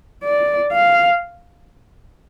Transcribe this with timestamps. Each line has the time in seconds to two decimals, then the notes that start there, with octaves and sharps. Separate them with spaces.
0.24 D5
0.72 F5